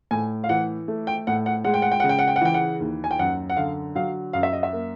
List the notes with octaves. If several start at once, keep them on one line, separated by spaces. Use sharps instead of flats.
A2 G#5
F5
E3 F#5
A3
G5
A2 F#5
F#5
G#3 F#5
G5
F#5
G5
F#5
C#3
G5
F#5
G5
F#5
E3 G5
F#5
D#2
G#5
G5
F#2 F#5
F#5
D3 F5
F#3 F5
F#2 F5
E5
D#5
E5
A#3